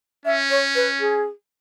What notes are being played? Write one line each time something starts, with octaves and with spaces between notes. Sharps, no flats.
C#4 E5
C#5
B4
G#4